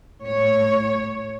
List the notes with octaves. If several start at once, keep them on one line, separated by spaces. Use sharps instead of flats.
A2 C#5